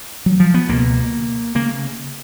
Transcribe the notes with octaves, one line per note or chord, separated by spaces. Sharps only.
F#3
F3
B3
C#2 B2 A#3
C#3 A#3